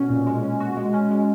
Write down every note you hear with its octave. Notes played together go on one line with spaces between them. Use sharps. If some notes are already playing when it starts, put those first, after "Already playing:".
Already playing: B2 C#4 F#4
A#2
G#3
C#4
F#4
G#3
C#4
G#3